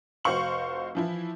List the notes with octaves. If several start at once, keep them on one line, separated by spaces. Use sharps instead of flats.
F1 F#4 C5 F5 C#6 F#7
E3 F3 E4